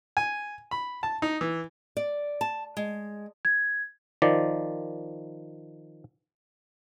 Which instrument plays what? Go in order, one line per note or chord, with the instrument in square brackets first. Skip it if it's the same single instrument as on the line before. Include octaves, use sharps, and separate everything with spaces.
[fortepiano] G#5
B5
A5
D#4
E3
[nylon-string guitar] D5
A5
G#3
[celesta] G#6
[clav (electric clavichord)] D#3 F3 D5